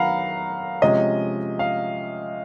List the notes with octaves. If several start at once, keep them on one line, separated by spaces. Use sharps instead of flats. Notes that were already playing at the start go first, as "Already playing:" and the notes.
Already playing: D#3 F#3 B3 F5 F#5 A#5 B5
C3 F3 G#3 C#4 D#5
F5